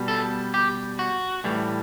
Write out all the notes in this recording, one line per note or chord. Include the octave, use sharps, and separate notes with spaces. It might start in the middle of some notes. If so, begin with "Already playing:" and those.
Already playing: B2 G3
A4
G4
F#4
A2 E3 G3